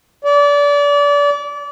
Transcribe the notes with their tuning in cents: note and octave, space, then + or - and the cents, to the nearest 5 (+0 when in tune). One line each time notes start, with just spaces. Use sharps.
D5 -30